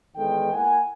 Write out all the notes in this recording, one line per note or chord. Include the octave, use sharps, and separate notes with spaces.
E2 D#3 G#3 B3 A4 G5
A#3 E4 F#5 G#5